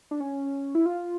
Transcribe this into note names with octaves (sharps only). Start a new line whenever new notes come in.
D4
C#4
E4
F4